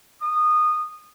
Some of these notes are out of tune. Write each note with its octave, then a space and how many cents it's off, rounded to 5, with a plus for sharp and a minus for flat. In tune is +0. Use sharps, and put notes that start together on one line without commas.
D#6 -20